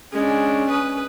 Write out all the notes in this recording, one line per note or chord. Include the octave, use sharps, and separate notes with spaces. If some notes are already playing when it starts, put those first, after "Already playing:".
G#3 C#4 D4
B4 D#6